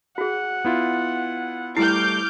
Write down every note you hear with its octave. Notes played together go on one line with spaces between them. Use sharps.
F#4 G#4 F#5
B3 E4 F4
G3 A3 E4 D6 F6 G6 C7